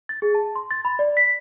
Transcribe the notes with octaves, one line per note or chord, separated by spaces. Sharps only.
A6
G#4
A5
C6
A6
B5
D5
B6